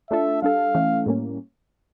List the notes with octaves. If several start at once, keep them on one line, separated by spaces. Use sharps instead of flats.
A3 D4 F4 A4 E5
G3 D4 A4 F5
E3 A3 C#4
A2 G3 A#3 C#4